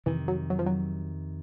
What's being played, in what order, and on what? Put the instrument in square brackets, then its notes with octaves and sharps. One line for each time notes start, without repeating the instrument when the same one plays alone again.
[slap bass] F2 C3 D#3 [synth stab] E3
[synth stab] F#3
F#3
F3
F#3